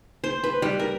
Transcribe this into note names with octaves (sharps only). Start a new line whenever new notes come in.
C5
B4
G3
A#4